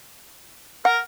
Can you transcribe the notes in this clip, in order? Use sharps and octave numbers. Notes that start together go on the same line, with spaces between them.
A#4 F#5